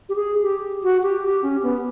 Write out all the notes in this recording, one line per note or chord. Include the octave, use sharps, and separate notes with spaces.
G4
G#4
G4
F#4
G4
G4
C#4
B3